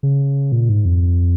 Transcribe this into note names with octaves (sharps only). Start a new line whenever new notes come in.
C#3
A#2
G#2
F2